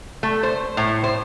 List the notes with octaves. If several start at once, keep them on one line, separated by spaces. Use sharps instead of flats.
A3
C5
A2
C5